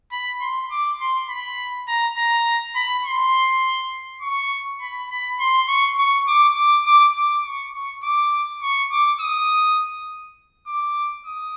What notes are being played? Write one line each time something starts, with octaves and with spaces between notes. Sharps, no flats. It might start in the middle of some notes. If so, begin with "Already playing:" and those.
B5
C6
D6
C6
B5
A#5
A#5
B5
C6
C#6
B5
B5
C6
C#6
C#6
D6
D6
D6
D6
C#6
C#6
D6
C#6
D6
D#6
D6
D#6